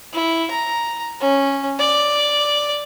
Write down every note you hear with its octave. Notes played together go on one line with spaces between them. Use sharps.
E4
A#5
C#4
D5